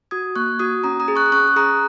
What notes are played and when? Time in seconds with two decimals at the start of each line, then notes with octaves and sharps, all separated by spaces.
0.11 F#4 D#6 G#6
0.36 A#3 C#6 F#6
0.59 F#4 D#6 G#6
0.84 C#4 A#5 D#6
1.00 A#5 D#6
1.08 G#4
1.15 C#6 F#6
1.26 D#6
1.32 C#4 C#6 F#6
1.48 F#6
1.56 G#4 A#5 D#6